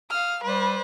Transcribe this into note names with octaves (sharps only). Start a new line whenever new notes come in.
F5 D#6 F6
G3 B4 C5 D5